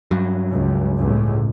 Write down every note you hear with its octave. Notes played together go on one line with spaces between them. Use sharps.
G2 F#3
C#2
G1 C#2 A2